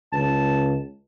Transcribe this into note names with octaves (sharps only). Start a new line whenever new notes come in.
C#2 A5